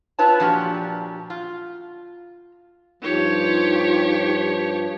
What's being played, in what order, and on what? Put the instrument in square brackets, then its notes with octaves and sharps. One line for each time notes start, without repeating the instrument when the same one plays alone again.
[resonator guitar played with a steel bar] E4 F4 B4 C#5 A5
A#2 F3 D4 F#4 G4
F4
[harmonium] G2 F3 [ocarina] D#4 [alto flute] F4 [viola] G4 C#5